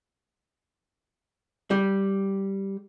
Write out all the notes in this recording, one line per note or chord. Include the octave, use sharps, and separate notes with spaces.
G3